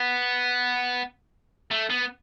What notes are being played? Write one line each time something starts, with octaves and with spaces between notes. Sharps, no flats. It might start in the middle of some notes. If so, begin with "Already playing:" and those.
Already playing: B3
A3
B3